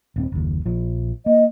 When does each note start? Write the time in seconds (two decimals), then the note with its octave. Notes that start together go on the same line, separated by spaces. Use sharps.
0.16 D#1 B3 C4
0.32 F#1 D#2
0.66 A#1 F3
1.26 A#3 D#5